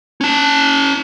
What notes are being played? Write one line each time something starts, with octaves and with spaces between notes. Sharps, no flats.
C#4 A5